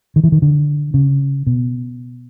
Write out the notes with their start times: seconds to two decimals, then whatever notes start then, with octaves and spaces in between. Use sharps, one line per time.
0.16 D#3
0.24 E3
0.32 D#3
0.42 D3
0.94 C#3
1.47 B2